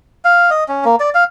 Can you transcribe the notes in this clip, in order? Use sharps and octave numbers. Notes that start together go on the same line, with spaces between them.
F5
D#5
C#4
A#3
D5
F5